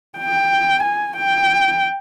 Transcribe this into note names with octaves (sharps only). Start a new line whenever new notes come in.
G5
G#5
G5